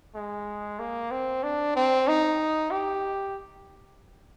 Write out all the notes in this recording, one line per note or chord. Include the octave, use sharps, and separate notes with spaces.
G#3
A#3
C4
D4
C4
D#4
G4